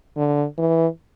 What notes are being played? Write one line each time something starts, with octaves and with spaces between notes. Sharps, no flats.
D3
E3